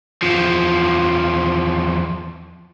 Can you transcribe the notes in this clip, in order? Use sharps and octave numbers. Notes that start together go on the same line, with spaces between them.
E2 F3